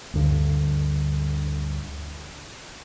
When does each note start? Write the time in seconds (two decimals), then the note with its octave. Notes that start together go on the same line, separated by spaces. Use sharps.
0.13 D2 G2 D3